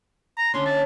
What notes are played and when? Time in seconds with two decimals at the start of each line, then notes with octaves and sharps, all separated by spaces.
0.37 A#5
0.54 D3 C#4 D4 C6
0.66 E5 A5